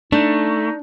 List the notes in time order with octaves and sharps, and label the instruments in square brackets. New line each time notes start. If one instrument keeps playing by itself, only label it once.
[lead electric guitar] A3 [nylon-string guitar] D4 [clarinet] D#4